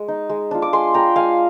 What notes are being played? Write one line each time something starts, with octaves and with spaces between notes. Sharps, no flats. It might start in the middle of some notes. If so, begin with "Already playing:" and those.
Already playing: G#3
D#4
G#3
D4 F4
D6
G#3 G#5 C6
D4 F4 G5 A#5
G#3 F5 G#5